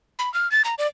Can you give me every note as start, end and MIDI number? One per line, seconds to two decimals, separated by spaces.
0.19 0.32 83
0.34 0.50 89
0.52 0.62 93
0.65 0.75 82
0.78 0.87 74